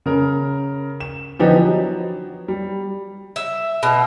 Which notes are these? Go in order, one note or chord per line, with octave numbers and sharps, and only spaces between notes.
C#3 A#4
E7
D3 E3 F3 B3 D#4 G4
F#3
G3
E5
B2